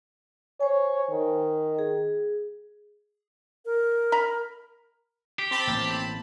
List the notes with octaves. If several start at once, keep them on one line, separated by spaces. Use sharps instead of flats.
C5 C#5 G#5
D#3
G#4
A#4
A#5 B5
G4
C4 A5 B5
A1 A#3